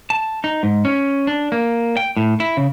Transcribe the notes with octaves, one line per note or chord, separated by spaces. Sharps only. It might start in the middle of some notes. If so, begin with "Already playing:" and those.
A5
D#4
G#2
C#4
D4
A#3
G5
A2
E4
C#3